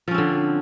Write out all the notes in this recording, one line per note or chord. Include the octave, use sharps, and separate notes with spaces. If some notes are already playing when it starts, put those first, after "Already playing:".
D3 F3 C4 C#4